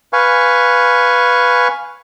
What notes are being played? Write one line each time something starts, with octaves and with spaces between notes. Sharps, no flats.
B4 F5 G#5 C#6